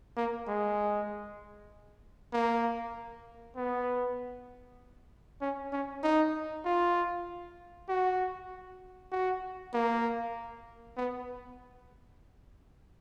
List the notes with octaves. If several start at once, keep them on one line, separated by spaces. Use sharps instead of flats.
A#3
G#3
A#3
B3
C#4
C#4
D#4
F4
F#4
F#4
A#3
B3